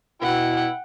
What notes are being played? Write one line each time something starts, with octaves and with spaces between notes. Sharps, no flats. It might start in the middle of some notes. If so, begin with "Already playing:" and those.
B2 E4 F#5 G5